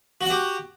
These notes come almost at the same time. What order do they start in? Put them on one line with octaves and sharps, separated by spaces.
F#4 F#5 G4